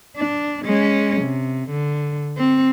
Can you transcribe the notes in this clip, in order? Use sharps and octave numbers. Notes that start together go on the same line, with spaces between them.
D4
G#3 C#4
C3
D3
C4